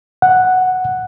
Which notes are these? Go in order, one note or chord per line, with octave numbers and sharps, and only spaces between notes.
F#5